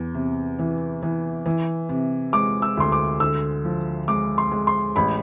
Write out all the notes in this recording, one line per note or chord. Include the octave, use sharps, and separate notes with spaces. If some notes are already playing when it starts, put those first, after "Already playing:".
Already playing: E2
C3
E3
E3
E3
C3
G#3 D6
E6
D2 C6
D6
D3 E6
F3
G#3 D6
C6
G#3
C6
A1 B5